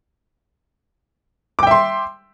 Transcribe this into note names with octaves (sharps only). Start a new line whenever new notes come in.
E5 G5 C6 D6